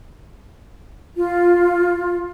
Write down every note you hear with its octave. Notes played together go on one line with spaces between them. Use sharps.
F4